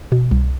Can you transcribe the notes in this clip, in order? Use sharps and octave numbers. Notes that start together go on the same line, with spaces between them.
B2
C2